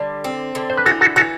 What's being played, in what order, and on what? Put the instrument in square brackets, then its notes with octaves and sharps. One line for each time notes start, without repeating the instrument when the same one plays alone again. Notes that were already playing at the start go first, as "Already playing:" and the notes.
Already playing: [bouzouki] D3 G3
C4
D3
[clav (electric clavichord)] C5
B4
[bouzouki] E3 [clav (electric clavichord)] F#4 A4
[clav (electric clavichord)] F#4 A4
[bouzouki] E3 [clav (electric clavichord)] F#4 A4